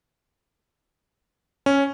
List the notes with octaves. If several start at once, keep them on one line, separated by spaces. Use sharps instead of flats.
C#4